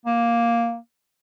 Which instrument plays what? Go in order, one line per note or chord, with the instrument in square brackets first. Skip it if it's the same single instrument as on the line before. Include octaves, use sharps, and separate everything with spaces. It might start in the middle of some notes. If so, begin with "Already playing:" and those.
[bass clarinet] A#3